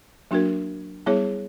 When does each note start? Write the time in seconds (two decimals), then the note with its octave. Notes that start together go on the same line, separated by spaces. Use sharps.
0.31 F#3 A#3 D4 F#4 A#4
1.06 G3 B3 E4 G#4 C#5